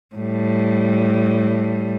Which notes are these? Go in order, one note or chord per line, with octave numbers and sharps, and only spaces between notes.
A2 G3